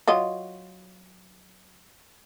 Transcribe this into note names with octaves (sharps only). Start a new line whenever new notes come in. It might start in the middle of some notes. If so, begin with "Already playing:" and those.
F#3 F4 D#5